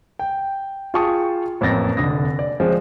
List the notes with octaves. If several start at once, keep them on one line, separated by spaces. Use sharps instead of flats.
G5
F4 G#4 G5 A5 C#6 D#6
A1 F2 A#3 A6 A#6
F1 D3 D#6 A#6
D5
F3 G#3 C4 F4